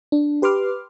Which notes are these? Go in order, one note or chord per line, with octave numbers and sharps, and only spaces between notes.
D4
G4 B4 C6 D6 F6